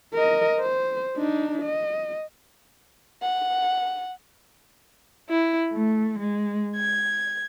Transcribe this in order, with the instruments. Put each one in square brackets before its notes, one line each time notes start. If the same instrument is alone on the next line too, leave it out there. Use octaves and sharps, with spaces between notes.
[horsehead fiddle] A#4 D#5
C5
D4 D#4
D#5
[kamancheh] F#5
[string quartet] E4
A3
G#3
G#6